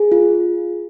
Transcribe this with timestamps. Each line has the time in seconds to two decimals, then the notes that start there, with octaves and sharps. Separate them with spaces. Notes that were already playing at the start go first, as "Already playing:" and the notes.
Already playing: G#4
0.12 F4